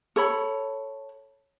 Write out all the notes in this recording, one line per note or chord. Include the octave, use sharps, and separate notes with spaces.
A4 C#5 B5